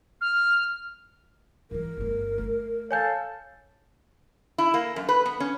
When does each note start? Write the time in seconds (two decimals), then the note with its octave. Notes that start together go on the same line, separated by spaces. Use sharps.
0.21 F6
1.71 G#2 E3 A#4
1.97 G1 A3
2.38 A3
2.91 A4 C#5 F5 G#5 G6
4.58 E4
4.74 A#3
4.96 F#2
5.09 B4
5.26 B3
5.40 C#4